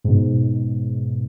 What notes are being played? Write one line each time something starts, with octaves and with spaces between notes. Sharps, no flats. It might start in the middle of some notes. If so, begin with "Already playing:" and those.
G#2 B2